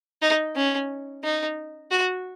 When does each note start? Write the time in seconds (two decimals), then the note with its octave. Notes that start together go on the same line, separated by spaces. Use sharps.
0.22 D#4
0.56 C#4
1.24 D#4
1.91 F#4